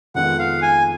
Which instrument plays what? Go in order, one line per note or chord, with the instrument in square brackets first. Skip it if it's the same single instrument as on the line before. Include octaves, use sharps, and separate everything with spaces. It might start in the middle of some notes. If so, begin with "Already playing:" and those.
[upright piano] F2 D#3 G#3 B3 F4 [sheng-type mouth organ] F#5
[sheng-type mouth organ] F5
G#5